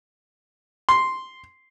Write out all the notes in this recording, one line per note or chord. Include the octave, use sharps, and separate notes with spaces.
C6